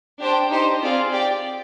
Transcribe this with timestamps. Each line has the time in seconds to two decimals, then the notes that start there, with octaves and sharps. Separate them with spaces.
0.20 D4 G4 C5 G5
0.51 D#4 G4 C5 D#5
0.82 C4 F4 G#4 D5 F5
1.12 G4 D5 G5